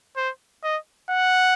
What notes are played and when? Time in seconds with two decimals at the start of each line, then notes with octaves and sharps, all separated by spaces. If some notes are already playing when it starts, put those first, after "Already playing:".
0.17 C5
0.63 D#5
1.10 F#5